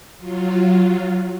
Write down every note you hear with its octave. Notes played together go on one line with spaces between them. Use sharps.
F#3 F4